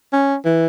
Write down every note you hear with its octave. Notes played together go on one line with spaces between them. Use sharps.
C#4
E3